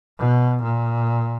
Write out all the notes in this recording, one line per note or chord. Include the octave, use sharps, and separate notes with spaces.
B2
A#2